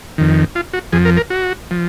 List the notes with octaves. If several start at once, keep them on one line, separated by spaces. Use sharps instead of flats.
F2 D#3
F4
F#4
F2 F3 G#4
A#4
A#4
F#4
F3